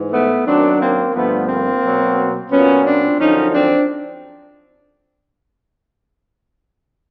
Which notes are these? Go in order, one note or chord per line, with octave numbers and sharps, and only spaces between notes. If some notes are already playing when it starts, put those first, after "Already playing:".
Already playing: G#2 E3
A3 B3
F#2 D#3 F#3 C4 D4
A#3 C4
G2 D3 F3 A3 B3
A#3 C4
B2 F#3
A#2 F#3 B3 C#4
C4 D4
F#2 D3 F3 C#4 D#4
C4 D4